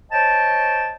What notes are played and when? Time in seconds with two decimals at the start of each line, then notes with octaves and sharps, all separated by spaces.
0.12 C5 C#5 D#5 G5 A5